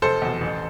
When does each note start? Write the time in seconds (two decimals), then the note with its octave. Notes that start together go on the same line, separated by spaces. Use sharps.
0.02 F1 A4 C5
0.22 E2 B2
0.41 A1